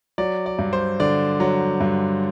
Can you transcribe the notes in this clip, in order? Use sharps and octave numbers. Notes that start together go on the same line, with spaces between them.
F#3 D5
D5
G2
C5
D3 D5
F#3
G2